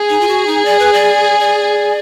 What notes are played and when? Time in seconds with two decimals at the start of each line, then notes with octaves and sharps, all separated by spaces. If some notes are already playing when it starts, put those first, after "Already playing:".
Already playing: G#4
0.09 D#4
0.20 F4
0.28 F#4
0.47 D#4
0.65 D5
0.79 B4
0.93 D5
1.40 D5